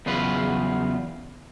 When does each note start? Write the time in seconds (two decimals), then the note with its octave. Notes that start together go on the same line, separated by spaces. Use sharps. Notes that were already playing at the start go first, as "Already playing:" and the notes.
0.06 E2 C#3 F#3 F4 B4